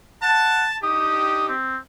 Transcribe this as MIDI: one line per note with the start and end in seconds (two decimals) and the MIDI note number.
0.23 0.64 78
0.23 0.76 81
0.83 1.53 62
0.83 1.53 63
0.83 1.53 67
0.83 1.45 87
1.49 1.77 60